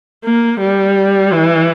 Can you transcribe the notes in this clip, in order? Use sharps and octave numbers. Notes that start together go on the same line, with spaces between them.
A#3
G3
E3